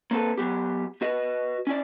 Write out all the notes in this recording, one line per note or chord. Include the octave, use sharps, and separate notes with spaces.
A#3 C4 A4 B4
F#3 B3 G4
F#4 B4 D#5
C#4 E4 D5